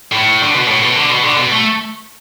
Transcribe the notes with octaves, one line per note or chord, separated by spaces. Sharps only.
A2
D3
B2
A2
B2
D3
B2
D3
B2
A3